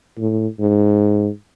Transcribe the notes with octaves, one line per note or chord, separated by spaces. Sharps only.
A2
G#2